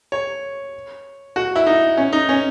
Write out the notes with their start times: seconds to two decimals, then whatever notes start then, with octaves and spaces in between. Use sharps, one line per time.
0.12 C#5
1.36 F#4
1.56 E4
1.67 D#4
1.97 C#4
2.13 D#4
2.29 C#4